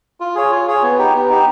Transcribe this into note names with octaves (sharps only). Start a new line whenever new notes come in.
F4
G#4 C#5
F4
G#4 C#5
B3
D#4 G4
B3
D#4 G4